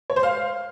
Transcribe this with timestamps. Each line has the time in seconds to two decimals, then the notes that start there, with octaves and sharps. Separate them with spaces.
0.10 C#5
0.16 C5
0.23 F5